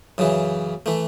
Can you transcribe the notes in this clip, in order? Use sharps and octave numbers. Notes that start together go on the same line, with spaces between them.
F#2 C#3 E3
E3 A3